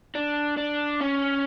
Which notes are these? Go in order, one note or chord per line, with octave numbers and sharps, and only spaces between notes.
D4
D4
C#4